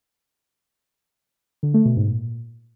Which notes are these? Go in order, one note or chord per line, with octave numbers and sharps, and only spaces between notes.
D3
A3
B2
G#2
A#2